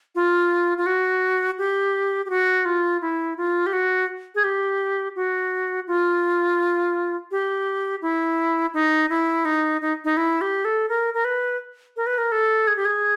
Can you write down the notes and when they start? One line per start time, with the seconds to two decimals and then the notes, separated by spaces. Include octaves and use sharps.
0.15 F4
0.78 F4
0.86 F#4
1.58 G4
2.26 G4
2.30 F#4
2.65 F4
3.02 E4
3.37 F4
3.66 G4
3.73 F#4
4.35 G#4
4.44 G4
5.16 F#4
5.87 F4
7.31 G4
8.02 E4
8.74 D#4
9.10 E4
9.45 D#4
9.82 D#4
10.05 D#4
10.17 E4
10.41 G4
10.65 A4
10.89 A#4
11.14 A#4
11.25 B4
11.97 A#4
12.06 B4
12.18 A#4
12.32 A4
12.67 G#4
12.76 G4
12.85 G#4